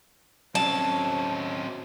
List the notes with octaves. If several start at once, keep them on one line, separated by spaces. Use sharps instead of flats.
F#3 C4 C#4 A5